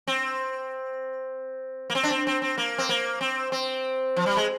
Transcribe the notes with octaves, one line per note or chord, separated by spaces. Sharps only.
C4
A#3
C4
D4
C4
C4
C4
A#3
C4
A#3
C4
C4
F3
G3
G#3